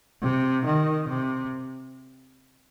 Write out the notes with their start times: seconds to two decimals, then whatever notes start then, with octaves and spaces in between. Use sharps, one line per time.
0.22 C3
0.65 D#3
1.08 C3